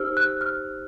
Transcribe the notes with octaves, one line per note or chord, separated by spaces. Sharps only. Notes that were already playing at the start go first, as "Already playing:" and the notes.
Already playing: D#4 G4 C5 E6 F6
F#6
F6